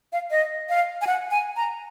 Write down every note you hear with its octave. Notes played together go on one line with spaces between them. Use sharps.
F5
D#5
F5
G#5
F#5
G#5
A#5